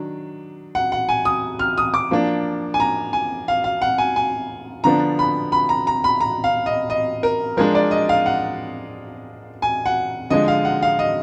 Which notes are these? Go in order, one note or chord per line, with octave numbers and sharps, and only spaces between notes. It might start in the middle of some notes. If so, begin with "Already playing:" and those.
Already playing: D#3 F#3 D4
F#5
F#5
G#5
D#6
F6
D#6
D6
F3 A#3 D4
G#5
A#5
G#5
F5
F5
F#5
G#5
G#5
D3 F3 B3 D4 A#5
B5
B5
A#5
A#5
B5
A#5
F5
D#5
D#5
A#4
F3 G#3 D4 A#4
D5
D#5
F5
F#5
G#5
F#5
D3 F3 G#3 D#5
F5
F#5
F5
D#5